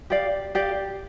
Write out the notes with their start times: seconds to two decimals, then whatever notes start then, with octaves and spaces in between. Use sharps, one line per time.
0.10 G4 D5 F5
0.55 G4 D5 F5